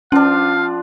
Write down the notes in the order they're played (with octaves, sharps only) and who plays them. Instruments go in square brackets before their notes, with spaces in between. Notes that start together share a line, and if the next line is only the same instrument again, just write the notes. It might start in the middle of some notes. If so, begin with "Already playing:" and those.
[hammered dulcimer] F3 D4 [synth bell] C#4 [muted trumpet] F5